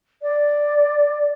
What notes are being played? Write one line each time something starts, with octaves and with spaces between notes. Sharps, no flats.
D5